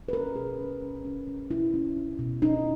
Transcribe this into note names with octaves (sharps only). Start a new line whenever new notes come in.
B4
C#4 A#4
B2 G#4
C#4
C#4
C#4
C#4
B2 E4
C#4
C#4
B2
C#4 D#4